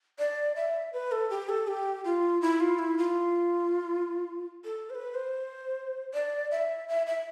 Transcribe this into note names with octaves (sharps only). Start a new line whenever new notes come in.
D5
E5
B4
A4
G4
A4
G4
F4
E4
F4
E4
F4
A4
C5
B4
C5
D5
E5
E5
E5